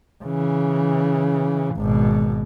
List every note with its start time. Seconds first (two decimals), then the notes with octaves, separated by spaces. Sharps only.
0.24 C#3 E3
1.76 G#1 B2